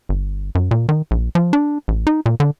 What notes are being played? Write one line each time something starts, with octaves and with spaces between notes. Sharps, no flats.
G1
F#2
A#2
D#3
A#1
F3
D4
A1
D#4
A#2
D3